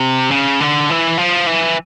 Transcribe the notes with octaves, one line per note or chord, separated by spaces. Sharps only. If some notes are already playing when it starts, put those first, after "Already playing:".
Already playing: C3
C#3
D3
E3
F3
E3